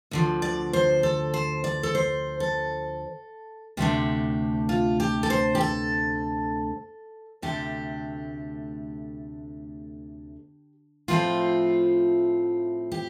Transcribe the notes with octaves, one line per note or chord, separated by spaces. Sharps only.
D2 D3 F3
D5
C5
A4
C5
D5
A4
C5
A4
D2 C3 A3 D4 G4
F4
G4
A4
C5
G4
A4
D2 C3 A3 D4 G4
A2 F3 A3 C4 F4
G4